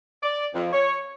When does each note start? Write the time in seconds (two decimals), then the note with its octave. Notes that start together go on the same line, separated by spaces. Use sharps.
0.23 D5
0.54 F2
0.73 C#5